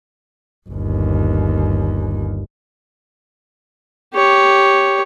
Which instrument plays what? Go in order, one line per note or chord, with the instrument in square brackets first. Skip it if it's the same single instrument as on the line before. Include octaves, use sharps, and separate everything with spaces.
[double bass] G1 D#2
[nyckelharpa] G4 C#5